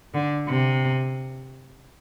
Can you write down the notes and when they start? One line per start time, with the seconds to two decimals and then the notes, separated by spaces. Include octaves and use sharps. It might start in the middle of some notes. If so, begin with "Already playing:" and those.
0.14 D3
0.48 C3